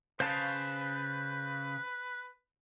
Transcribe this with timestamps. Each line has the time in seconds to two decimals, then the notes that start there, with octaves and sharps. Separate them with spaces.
0.20 C#3 B4 C5 F5 A5